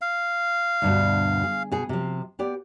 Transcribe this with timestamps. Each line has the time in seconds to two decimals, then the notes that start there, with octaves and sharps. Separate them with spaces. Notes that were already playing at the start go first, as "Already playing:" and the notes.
0.01 F5
0.82 D2 G2 B2
1.44 G#4
1.72 B2 G#4
1.89 C3 F3
2.39 B3 G4 D5